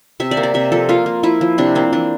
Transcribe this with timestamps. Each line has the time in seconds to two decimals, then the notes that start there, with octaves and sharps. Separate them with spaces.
0.20 C3 E5
0.31 D5
0.37 A#3
0.43 D5
0.54 C3 E5
0.72 F3 A4
0.89 A#3 F4
1.06 A#3
1.23 F3 E4
1.41 F3
1.58 C3 D4
1.75 A#3 C4
1.93 E3 D4